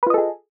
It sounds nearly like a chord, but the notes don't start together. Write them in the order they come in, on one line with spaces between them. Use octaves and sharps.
B4 F4 D#5 A4 G#4